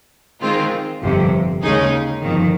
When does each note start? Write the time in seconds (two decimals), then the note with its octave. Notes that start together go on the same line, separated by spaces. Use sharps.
0.40 D#3 G#3 C4 F4
1.01 G1 F2 C3
1.62 D#2 C#3 G#3 D#4 G#4
2.22 G1 F2 D#3